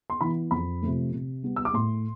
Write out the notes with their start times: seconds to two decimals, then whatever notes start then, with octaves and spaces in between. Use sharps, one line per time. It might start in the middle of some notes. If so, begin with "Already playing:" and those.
0.10 C6
0.21 E3 B3 B5
0.51 F2 B5
0.82 C3 F3 A3
1.12 C3
1.43 G3 B3
1.56 E6
1.65 D6
1.74 A2 C6